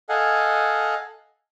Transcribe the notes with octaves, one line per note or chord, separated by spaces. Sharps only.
A4 D#5 F5 F#5 G#5